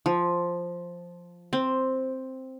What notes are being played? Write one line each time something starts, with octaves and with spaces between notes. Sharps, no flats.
F3
C4